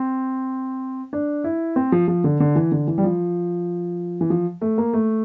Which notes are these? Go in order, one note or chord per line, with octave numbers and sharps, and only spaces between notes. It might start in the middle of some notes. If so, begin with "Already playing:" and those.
Already playing: C4
D4
E4
C4
F3
F3
D3
D3
E3
D3
E3
G3
F3
E3
F3
A3
A#3
A3